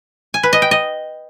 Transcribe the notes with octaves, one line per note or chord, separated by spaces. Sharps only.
G#5
B4
D#5
G5
D#5